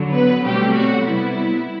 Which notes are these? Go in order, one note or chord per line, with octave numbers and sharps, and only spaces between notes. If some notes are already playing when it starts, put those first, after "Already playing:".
Already playing: D3 F#3
B3 B4
B2 F#3 G3 A3 C4 G4
F#3 F#4
C3 G3 B3 E4